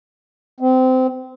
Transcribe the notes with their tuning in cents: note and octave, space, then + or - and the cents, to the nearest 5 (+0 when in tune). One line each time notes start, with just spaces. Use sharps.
C4 -25